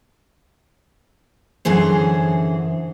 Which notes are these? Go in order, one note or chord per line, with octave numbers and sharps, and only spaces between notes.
F#2 D3 E3 G#4 C5